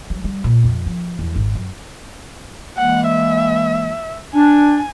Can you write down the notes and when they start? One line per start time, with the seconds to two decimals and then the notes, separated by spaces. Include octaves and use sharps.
0.10 F#3
0.24 G3
0.44 A#2
0.64 F2
0.86 F3
1.19 E2
1.36 G#1
1.55 F#2
2.78 E3 G#3 A#3 F#5
3.07 E5
4.34 D4 G#5